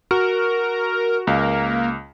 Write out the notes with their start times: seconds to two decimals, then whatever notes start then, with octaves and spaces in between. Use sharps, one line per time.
0.11 F#4 A#4
1.27 C#2 A#3